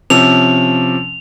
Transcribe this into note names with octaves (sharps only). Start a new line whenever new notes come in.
C3 F3 C#4 F7